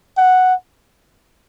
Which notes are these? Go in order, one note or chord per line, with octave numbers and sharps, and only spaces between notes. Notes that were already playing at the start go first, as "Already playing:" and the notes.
F#5